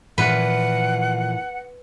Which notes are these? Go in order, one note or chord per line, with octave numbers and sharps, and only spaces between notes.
A#2 E3 F3 B4 F#5